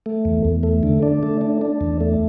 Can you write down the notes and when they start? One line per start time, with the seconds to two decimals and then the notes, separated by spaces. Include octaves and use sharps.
0.06 A3
0.25 E2
0.45 E2
0.63 A3
0.83 D3
1.03 D4
1.23 A3
1.41 D4
1.61 D4
1.81 E2
2.00 A3